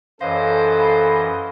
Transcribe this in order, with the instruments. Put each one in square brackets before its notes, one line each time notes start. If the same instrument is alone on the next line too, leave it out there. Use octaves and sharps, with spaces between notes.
[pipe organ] F#2 E3 D#5 [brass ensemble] A4 [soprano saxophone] C5 [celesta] C#5 F5
[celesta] F5 B5 C6